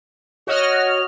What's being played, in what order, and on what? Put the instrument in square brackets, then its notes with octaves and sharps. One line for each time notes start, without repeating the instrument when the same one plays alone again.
[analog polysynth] F#4 D#5 F6 [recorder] C#5